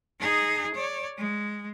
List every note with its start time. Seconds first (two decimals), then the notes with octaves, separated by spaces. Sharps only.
0.20 D#4 G#4
0.74 C#5 D5
1.17 G#3